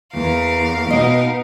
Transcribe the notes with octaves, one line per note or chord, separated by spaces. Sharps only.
E2 A#4 F5
B2 B3 D#4 D#5